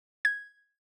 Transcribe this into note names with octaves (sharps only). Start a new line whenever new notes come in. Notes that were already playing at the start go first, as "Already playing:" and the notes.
G#6